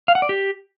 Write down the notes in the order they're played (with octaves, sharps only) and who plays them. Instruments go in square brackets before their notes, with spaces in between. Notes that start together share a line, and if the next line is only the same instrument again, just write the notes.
[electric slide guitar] F5
F#5
D5
G4